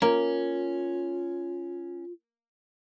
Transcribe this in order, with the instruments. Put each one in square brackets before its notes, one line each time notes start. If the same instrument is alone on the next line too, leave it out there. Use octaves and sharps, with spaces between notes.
[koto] A#3 [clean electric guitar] C#4 [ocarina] F4